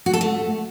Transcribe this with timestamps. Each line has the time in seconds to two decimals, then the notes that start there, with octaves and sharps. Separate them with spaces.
0.06 F#4
0.13 A4
0.21 A3